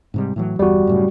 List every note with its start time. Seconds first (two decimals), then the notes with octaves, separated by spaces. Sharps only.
0.14 G#2 C3 G3
0.36 A2 E3 F#3
0.59 G1 E2 G3 F#4
0.87 F#2 A2 C#3